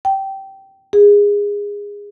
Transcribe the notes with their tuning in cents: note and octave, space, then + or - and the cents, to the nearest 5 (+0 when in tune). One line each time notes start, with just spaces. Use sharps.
G5 -15
G#4 -20